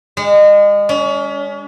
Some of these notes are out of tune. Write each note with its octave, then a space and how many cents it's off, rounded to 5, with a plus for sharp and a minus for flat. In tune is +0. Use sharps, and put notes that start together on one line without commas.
G#3 -30
C#4 +30